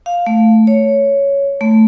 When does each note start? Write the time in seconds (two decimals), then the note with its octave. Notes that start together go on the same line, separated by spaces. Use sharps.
0.06 F5
0.27 A3
0.67 C#5
1.61 A3